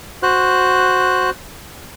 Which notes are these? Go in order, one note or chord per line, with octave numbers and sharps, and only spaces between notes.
F#4 C5 F#6